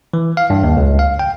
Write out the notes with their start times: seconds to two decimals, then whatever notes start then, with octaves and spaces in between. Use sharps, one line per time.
0.14 E3
0.37 F5
0.50 G2
0.64 D#2
0.77 C#2
0.99 F5
1.19 G5